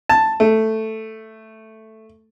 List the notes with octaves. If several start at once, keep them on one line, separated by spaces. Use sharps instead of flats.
A5
A3